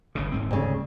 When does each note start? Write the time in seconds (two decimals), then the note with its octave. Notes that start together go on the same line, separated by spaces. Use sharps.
0.15 G1 G2 C#3
0.32 D#1 G#2 C4
0.51 D2 C#3